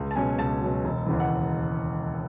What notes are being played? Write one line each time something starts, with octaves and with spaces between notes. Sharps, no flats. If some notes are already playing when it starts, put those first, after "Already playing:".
Already playing: C#2
A5
B2 F#3 C#4 G#5
C#2 A5
B2 F#3 C#4
E1
D#2 C#3 E3
F#5